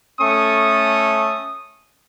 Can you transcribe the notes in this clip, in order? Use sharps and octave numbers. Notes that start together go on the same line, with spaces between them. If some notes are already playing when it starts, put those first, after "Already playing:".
A3 C#4 A4 C#6 D#6